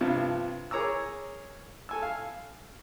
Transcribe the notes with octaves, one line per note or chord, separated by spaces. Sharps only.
G2 C3 F3
G#4 A#4 C#5 A#5 D6 E6
A4 G#5 E6
F5